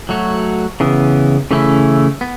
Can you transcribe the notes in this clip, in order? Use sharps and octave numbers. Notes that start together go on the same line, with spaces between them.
F#3 A3 F#4 C#5
C#3 E3 B3
C#3 E3 A3 C#4 E4
B3